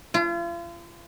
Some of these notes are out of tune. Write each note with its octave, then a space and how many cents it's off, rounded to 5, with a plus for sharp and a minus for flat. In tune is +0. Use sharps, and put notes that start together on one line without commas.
F4 -40